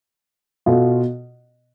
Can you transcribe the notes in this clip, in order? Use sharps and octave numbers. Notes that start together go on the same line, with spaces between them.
B2 B3 F4 A4